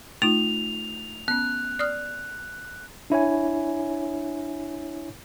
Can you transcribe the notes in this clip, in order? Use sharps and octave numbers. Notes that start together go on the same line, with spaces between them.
A3 D#4 F4 F7
B3 C#4 F#6
D5 D#6 F6
D4 E4 C#5 G#5